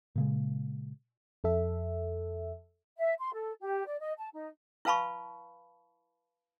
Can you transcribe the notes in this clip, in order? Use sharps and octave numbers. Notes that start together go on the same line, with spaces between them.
A#2 C#3 G#3
F2 A4 E5
E5
C6
A4
G4
D5
D#5
A5
D#4
E4 B4 F5 A5 B5 C#6